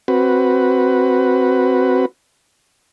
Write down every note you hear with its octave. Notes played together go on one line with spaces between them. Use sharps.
C4 F#4 B4